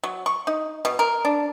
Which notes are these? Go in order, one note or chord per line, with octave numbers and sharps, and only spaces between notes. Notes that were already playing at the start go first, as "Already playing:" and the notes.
F#3
C#6
D#4
B2
A#4
D4